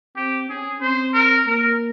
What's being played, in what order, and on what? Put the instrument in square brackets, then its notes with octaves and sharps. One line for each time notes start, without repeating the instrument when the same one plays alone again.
[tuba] C4 [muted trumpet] G4
[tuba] C#4 [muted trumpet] G#4
[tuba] C4 [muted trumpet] C5
[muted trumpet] A#4
[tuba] A#3 [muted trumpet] A#4